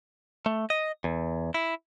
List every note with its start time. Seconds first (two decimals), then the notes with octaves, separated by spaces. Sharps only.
0.46 A3
0.70 D#5
1.04 E2
1.54 E4